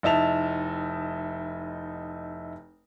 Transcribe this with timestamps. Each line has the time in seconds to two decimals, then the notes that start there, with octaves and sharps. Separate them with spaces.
0.03 F1 D#4 E4 A5 F7